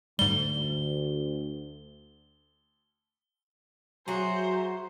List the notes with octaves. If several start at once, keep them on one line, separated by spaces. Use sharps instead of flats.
D2 G#2 G3 G7
F#3 F#4 G#4 C5 E5 A#5